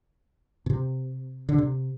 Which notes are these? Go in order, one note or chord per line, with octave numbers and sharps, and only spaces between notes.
B2
C3
D3
C3